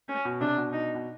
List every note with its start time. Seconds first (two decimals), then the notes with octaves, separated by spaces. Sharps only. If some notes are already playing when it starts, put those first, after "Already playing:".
0.09 C#4
0.25 B2
0.41 C3 D4
0.57 B2
0.73 D#4
0.95 B2